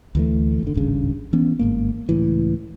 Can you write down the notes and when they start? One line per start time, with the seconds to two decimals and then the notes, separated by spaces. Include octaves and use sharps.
0.15 D2 E3 A3
0.63 F#1 D3
0.74 D1 G#1 G2 C#3
1.33 E3 B3 C#4
1.59 G1 G#2 A#3
2.09 C#2 A2 E3